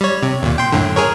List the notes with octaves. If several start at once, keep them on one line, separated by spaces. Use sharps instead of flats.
G3 C#5
C3
D#2 A#2
G5 C6
F#2 A2 D3
G#4 A#4 C#5